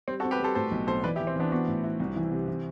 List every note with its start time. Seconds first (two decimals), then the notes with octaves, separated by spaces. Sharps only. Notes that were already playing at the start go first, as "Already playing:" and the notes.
0.08 G3 C4
0.20 F#4 A4
0.24 C4
0.31 G4 B4
0.40 G3 A4 C5
0.55 A2 A4 C5
0.71 B1
0.87 B1 A4 C5
1.04 E3 B4 D5
1.16 E4 G4
1.20 E3
1.27 C4
1.36 E3 B3 D4
1.52 B3 D4 F#4
1.68 A2
1.84 E4
2.00 C2
2.16 E3
2.32 C3
2.48 E3